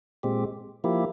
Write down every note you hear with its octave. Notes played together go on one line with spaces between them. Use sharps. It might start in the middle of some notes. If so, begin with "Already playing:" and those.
A#2 G#3 C4 G4
F3 A#3 E4 G4